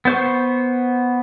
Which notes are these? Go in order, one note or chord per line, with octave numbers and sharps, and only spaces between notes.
B3 C5 C#6